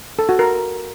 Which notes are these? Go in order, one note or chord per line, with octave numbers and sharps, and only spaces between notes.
A4
F#4
A#4